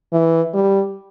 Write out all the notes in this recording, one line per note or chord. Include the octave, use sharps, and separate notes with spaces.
E3
G3